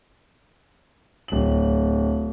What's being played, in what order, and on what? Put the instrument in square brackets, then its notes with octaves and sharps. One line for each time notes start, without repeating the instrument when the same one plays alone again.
[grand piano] D1 F#7